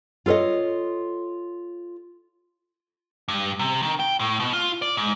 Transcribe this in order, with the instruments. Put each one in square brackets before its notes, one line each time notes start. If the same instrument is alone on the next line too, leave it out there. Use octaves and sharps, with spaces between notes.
[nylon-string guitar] F4 A4 B4 C#5 D#5
[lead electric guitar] G2
C3
D#3
G5
A2
B2
F4
D5
G#2